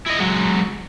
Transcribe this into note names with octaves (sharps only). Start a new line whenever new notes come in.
E4 D#5
F#3 G#3